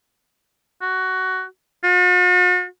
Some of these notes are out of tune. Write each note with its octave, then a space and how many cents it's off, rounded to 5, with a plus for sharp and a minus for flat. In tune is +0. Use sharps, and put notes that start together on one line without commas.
F#4 +15
F#4 -45